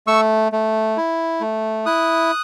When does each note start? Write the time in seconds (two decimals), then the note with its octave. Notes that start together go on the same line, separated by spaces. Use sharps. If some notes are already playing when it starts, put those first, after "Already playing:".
0.07 A3 C#6 E6
0.52 A3
0.97 E4
1.41 A3
1.86 E4 D#6 F#6